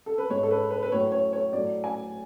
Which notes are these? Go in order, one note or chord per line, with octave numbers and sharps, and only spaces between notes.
A4
B4
G#2 G#3 C#5
A4
B4
B4
B4
A2 F#3 A3 C#5
C#5
C#5
A2 F#3 A3 D5
G#5